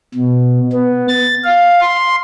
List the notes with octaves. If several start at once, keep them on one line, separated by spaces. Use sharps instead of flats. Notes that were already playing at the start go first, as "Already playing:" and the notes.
B2
B3
A6
F5
C6